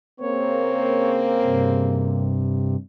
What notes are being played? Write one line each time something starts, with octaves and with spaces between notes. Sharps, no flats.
C#3 A#3 C4 C#5
G2 C3